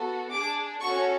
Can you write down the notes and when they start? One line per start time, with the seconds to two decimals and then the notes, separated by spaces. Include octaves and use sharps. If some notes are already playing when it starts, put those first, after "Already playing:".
Already playing: B3 F#4 A4
0.30 D4 G#4 D6
0.80 C#4 F#4 A4 C#6